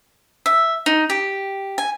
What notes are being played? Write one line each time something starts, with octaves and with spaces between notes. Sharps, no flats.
E5
D#4
G4
G#5